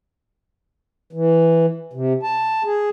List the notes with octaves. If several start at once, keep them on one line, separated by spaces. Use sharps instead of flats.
E3
C3
A5
G#4